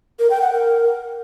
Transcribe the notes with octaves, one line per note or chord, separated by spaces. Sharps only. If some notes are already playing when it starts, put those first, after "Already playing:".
A#4
G5
F#5
A#4